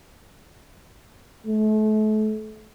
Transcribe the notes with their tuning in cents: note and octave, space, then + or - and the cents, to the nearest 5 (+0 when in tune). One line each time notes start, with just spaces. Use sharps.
A3 -35